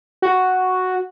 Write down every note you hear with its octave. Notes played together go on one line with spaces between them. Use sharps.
F#4